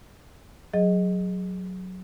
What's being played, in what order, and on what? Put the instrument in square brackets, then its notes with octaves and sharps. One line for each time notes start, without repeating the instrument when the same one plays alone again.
[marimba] F#3 G#4 D#5